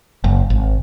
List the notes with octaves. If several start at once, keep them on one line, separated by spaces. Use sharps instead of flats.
F#1
G#1